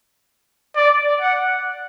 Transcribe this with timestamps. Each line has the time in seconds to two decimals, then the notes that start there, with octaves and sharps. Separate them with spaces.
0.76 D5
1.21 F#5